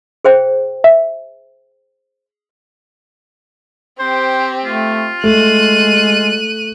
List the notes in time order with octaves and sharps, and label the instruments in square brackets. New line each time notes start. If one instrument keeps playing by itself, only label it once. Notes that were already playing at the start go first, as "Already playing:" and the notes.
[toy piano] G#4 C5 G5
[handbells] E5
[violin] C4 G4 [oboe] C5
[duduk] A3 [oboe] F4
[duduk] G#3 [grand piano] A3 [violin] F#6 D#7